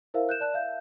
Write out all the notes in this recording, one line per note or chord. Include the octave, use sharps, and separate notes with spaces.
E4 A#4 C5 E5 F5
F#6 G6 E7
D5 A5 F#6
E5 F5 G6